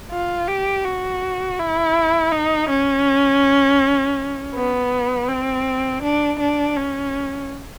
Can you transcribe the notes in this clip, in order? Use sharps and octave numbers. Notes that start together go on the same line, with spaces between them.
F4
G4
F#4
E4
D#4
C#4
B3
C4
D4
D4
C#4